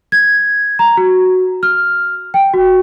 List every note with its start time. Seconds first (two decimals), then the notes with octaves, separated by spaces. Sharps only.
0.12 G#6
0.79 A#5
0.97 F#4
1.63 F6
2.34 G5
2.53 F#4